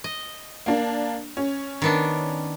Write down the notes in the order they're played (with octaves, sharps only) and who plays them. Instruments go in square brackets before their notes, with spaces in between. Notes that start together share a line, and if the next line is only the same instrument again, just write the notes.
[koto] D#5
[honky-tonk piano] A#3 D4
C#4
[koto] D#3 B3 D4